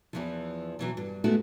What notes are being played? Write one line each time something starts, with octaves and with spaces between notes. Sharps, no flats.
E2 E3 F3
B2 E3 F#3
G2
G#3 A3 B3 E4 F#4